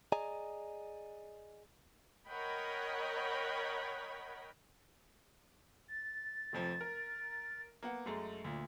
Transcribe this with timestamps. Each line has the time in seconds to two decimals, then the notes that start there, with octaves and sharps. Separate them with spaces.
0.12 G#4 D5 D#5 G#5 A#5
2.28 A#4 C#5 D#5 F#5 G5 B5
5.88 A6
6.53 F1 F2 F3
6.81 A#4
7.83 A#3 B3 F#5
8.06 F#2 G#3 A3
8.44 D2 A#2